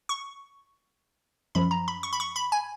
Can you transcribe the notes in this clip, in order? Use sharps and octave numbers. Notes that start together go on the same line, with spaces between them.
C#6
F#2 F3 B5
A#5
B5
C#6
B5
C#6
B5
G#5